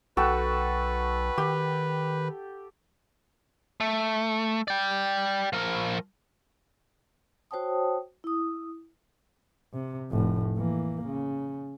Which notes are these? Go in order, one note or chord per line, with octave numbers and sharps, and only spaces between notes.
B1 F#4 A4 B4 G5
D#3 G4
A3
D5 G5
F3 A#4
F#4 C5 C#5 G5 A5 D#6
E4 D#6
C3
F1 A2
E3 A#3
C#3